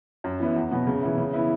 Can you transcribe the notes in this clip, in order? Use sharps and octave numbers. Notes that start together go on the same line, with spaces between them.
F#2
E3 B3 E4
E2
B2 F#3 B3
C#3
E3 B3 E4
C#3
E3 B3 E4